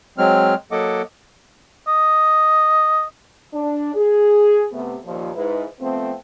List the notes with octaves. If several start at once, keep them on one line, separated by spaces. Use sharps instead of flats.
F#3 G#3 C4 F6
F#3 A#3 A4 D#5 F#5 D6
D#5
D4
G#4
C3 A3 B3
D#2 A#2 F3
G#2 E4 B4
F3 A3 B3 C4